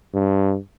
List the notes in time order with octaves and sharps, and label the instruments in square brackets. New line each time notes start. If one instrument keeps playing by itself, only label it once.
[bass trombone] G2